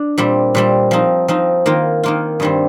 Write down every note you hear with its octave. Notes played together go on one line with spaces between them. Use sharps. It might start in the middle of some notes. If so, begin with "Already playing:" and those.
Already playing: D4
A#2 G3 C4
A#2 G3 C4
F3 C4 D#4
F3 C4 D#4
D#3 A#3 F4
D#3 A#3 F4
G2 D#3 G3 C4